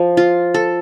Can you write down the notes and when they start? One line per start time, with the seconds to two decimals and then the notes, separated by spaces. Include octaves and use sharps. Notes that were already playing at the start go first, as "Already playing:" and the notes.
Already playing: F3
0.17 F4
0.54 A4